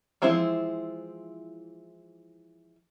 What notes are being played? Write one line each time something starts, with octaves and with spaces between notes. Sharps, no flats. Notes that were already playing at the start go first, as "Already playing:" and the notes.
E3 F3 G#3 C4 E4